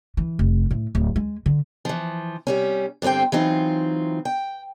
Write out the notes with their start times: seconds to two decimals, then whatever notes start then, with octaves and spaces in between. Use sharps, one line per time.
0.17 E3
0.39 F1
0.71 A2
0.95 D1
1.16 G#3
1.46 D3
1.85 E3 F3
2.47 C3 G3 C#4
3.02 G2 D3 C4 C5 G5
3.32 E3 F#3 C4 D#4 F4
4.25 G5